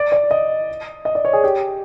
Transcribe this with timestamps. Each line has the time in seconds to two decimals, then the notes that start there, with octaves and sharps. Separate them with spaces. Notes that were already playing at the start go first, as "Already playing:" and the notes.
Already playing: D5
0.12 D5
0.31 D#5
1.05 D#5
1.15 D5
1.25 C#5
1.33 G#4
1.44 G4